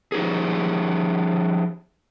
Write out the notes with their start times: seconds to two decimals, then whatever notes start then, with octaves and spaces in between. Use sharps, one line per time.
0.12 F3 D#4 G4 G#4